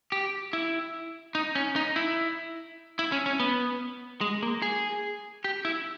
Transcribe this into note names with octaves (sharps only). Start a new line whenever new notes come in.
G4
E4
D#4
C#4
D#4
E4
E4
C#4
C#4
B3
G#3
A#3
G#4
G4
E4